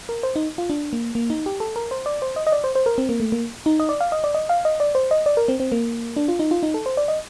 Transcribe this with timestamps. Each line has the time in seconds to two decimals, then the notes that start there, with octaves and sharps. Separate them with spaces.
0.09 A#4
0.23 C5
0.36 D#4
0.58 F4
0.70 D4
0.93 A#3
1.15 A#3
1.30 D#4
1.46 G4
1.60 A4
1.76 A#4
1.91 C5
2.06 D5
2.22 C5
2.36 D#5
2.47 D#5
2.52 D5
2.64 C5
2.75 C5
2.86 A#4
2.98 C4
3.09 A#3
3.20 A3
3.32 A#3
3.66 D#4
3.80 D#5
3.89 D5
4.00 F5
4.12 D#5
4.24 D5
4.35 D#5
4.49 F5
4.65 D#5
4.80 D5
4.95 C5
5.11 D#5
5.26 D5
5.37 A#4
5.48 C4
5.60 C4
5.72 A#3
6.16 D4
6.28 F4
6.39 D#4
6.51 F4
6.63 D#4
6.74 A4
6.86 C5
6.97 D5
7.08 D#5